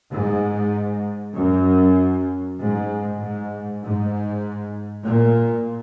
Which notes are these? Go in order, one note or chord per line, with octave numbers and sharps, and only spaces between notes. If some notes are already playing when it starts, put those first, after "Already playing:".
G#2
F#2
G#2
G#2
G#2
A#2